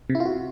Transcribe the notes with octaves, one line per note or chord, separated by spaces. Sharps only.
C3
E4
F4
F#4